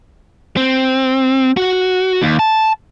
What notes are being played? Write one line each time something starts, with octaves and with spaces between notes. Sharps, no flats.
C4
F#4
D#2
A5